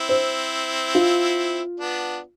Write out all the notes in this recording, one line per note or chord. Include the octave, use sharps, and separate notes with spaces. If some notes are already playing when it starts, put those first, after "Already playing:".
Already playing: C4 E4
C5
F4
B3 D4